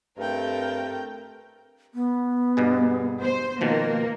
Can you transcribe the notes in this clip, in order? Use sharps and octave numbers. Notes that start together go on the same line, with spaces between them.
G2 A3 C4 A#4 G5
B3
G2 B2 G#4
C5
B2 D#3 F3 A#3